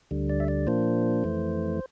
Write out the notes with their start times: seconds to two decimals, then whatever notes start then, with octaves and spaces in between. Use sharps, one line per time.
0.11 D2 D3 G3
0.30 D5
0.40 E5
0.48 D5
0.67 A#2 F3 A#3 D4 C5
1.24 F2 E3 A3